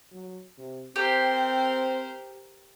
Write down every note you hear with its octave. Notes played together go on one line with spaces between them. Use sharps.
F#3
C3
C4 G4 A#4 C5